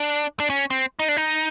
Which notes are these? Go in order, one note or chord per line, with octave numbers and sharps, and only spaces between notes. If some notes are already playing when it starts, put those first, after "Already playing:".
Already playing: D4
D4
C#4
C4
D#4
D4
D#4